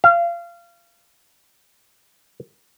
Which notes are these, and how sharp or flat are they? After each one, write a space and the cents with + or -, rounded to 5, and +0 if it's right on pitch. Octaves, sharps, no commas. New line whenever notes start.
F5 -25